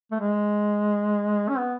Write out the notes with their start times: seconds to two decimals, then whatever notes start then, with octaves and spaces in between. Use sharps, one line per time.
0.11 A3
0.19 G#3
1.49 C#4
1.58 B3